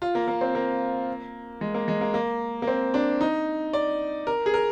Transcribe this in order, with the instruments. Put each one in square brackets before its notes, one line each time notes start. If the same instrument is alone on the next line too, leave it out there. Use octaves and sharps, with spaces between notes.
[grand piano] F4
A#3
A#3
C4
A#3
G#3
A#3
G#3
A#3
A#3
A#3
C4
D4
D#4
D5
A#4
G#4
A#4